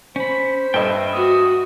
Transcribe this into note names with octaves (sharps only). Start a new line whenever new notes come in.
C#4 C5 B5
G2 A4 B4 D#5 E5 G5
F#4 D#6